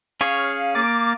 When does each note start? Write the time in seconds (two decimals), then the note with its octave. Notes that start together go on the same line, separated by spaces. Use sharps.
0.21 C#4 G#4 C#5 F5
0.75 A#3 D6 A6